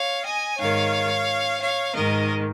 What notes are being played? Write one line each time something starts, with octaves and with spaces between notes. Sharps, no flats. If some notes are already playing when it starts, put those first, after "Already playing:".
Already playing: C#5 F5
D#5 G#5
G#2 D#3 C#5 F5
C#5 F5
G#2 D#3 A#4 D#5